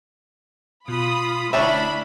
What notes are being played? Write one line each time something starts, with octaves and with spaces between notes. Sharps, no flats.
B2 F4 B5 D#6
F1 D2 C#4 D4 E4 E5 B5